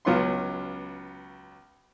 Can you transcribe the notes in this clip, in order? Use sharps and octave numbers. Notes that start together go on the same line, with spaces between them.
C#2 F#3 B3 C#4 F5 C6